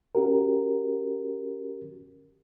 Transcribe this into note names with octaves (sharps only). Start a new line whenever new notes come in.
C#4 F#4 G4 A#4